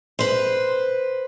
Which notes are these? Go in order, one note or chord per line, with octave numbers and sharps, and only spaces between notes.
B4 C5